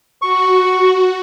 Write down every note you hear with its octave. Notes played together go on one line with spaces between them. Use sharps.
F#4 C#6